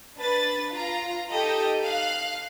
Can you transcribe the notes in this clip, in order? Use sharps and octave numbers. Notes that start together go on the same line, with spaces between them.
D4 B4 A6
F4 A#5
D#4 G4 A4 D#5
F5 F#6